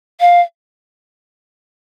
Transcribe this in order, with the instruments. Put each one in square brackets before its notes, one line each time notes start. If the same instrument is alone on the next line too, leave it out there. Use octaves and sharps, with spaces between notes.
[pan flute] F5